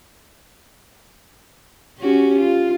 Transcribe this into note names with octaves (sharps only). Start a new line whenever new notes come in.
C#4 F#4 G4
F4